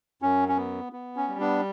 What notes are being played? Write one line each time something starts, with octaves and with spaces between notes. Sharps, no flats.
F#2 C#4
C#4
B3
B3
C#4
G3
B3 D4